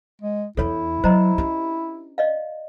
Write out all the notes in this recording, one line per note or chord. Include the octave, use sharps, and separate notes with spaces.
G#3
E2 D4 E4 A4 C#5
F#3 C5 D#5 A#5
C#4 D4 G4
D5 D#5 F5